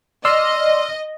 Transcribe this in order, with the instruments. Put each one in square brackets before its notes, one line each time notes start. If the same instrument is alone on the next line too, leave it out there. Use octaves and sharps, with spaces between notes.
[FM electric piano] D5 C6 F6 [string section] D#5 [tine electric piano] E6